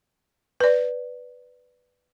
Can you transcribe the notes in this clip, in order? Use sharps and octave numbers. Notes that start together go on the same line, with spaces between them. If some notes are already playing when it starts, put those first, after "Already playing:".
B4 D5